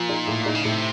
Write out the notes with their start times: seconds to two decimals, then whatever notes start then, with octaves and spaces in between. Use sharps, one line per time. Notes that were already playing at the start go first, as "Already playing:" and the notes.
Already playing: A#2 F3
0.09 D#4
0.27 A2
0.46 D#4
0.55 C#3
0.64 A2 C3